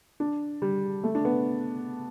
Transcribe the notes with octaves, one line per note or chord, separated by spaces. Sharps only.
D4
G3
A3
D4
B3